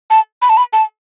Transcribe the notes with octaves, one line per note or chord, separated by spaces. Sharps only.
A5
B5
A5
B5
A5